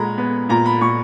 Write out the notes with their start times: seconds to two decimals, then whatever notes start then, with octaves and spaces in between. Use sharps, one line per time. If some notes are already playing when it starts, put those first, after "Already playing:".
Already playing: A#2 G#3 A#5 B5
0.18 B3
0.49 A#2 A#5
0.66 B5
0.81 A#2 C#6